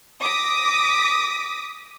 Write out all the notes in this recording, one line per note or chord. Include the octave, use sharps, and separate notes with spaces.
D6 D#6 A#6 B6